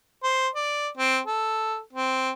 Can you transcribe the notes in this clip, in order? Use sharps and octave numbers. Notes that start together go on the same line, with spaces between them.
C5
D5
C4
A4
C4